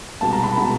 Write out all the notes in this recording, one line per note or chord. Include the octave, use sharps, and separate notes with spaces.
C2 B2 G#3 A5
A#5
B5
B2 G#3